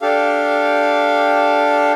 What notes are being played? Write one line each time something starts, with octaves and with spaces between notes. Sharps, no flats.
D4 G4 A4 F5